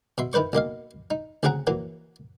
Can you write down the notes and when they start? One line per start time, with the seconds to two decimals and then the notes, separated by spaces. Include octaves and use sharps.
0.18 B2 E5 C6
0.33 D#3 E4 B4 C5 C#6
0.53 B1 A#3 D#5 F5
1.11 D#4
1.43 D2 C#3 C4 G#4 F#5 A#5
1.67 E3 F#3 A#3